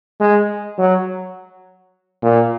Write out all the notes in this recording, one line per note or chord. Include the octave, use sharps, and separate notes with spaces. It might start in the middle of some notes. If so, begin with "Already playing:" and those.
G#3
F#3
A#2